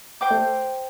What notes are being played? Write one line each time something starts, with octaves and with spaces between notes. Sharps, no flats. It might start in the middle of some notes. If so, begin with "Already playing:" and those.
C5 G5 D6
A3